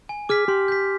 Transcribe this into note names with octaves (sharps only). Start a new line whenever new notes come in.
G#5
G#4 D6 F6 B6
G4 C6
G6 B6